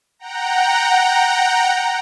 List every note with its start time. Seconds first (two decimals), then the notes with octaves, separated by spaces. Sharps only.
0.19 F#5 G5 A#5